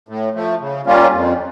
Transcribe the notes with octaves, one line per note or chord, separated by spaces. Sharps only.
A2
F3 A3
C#3
G3 A#3 C#4 F4
F2